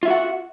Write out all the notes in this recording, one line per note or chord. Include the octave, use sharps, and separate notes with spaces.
F4 F#4 E5 F#5